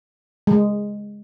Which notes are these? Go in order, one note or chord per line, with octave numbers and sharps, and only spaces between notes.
G#3